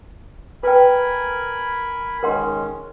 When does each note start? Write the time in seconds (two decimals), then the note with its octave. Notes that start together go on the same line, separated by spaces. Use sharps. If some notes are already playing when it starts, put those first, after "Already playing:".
0.63 A#4 B4 G5 G#5 B5
2.23 D#3 G#3 C#4 A#4 F#5 C6